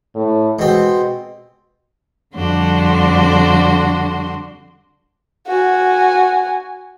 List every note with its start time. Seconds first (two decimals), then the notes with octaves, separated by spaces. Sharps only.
0.15 A2
0.59 B2 G#3 C4
2.35 F2 D3 G3 D4 F#4 C6
5.48 F#4 G#5